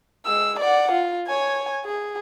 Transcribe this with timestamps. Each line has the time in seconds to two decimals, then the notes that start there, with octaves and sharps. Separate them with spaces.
0.26 G#3 E6
0.59 D5 F#5
0.92 F4
1.27 C#5 G#5
1.85 G#4